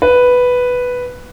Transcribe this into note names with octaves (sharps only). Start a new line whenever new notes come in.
B4